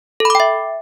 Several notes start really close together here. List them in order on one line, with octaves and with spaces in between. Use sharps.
A4 B5 D6 G5 E5